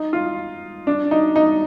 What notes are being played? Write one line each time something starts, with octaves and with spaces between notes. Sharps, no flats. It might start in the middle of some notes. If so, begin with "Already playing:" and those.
Already playing: D#4
F4
D4
D#4
D#4